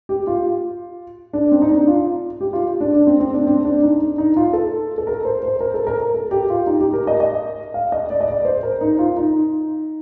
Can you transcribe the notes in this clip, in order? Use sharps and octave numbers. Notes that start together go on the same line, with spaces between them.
G4
F4
D4
C4
D#4
D4
F4
G4
F4
D4
D4
C4
C4
D4
C4
D4
D#4
D4
D#4
F4
A4
A4
A#4
C5
C5
A#4
A4
A#4
A4
G4
F4
D#4
G4
A#4
D#5
D#5
F5
D#5
D5
D#5
D5
C5
A#4
D#4
F4
D#4